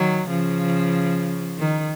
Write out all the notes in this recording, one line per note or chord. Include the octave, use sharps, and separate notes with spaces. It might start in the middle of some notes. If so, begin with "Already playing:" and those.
Already playing: D#3 F#3
C#3 F3
D#3